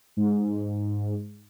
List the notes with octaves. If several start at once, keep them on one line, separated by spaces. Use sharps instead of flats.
G#2